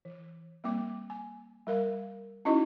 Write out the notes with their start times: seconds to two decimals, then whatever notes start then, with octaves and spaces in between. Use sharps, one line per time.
0.05 E3
0.64 G3 A#3 C4 D6
1.10 G#5
1.67 G3 A#4 F5
2.45 C#4 D#4 E4 F#4 D#5